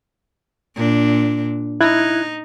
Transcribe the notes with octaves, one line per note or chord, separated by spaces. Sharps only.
A#2 D4
D#4 E4 F#6 G#6